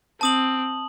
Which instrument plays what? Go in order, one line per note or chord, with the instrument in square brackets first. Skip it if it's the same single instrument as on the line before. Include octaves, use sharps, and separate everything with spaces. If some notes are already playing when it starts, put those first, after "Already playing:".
[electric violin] C4 [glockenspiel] A5 D#6 F#7